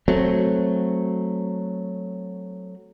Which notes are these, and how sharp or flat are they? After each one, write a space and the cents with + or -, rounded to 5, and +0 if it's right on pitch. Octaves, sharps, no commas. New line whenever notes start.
F#3 +0 A3 +0 C4 +5